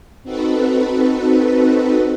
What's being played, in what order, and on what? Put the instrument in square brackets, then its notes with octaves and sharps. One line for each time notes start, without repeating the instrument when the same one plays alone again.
[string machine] C4 D#4 F#4 A4 B4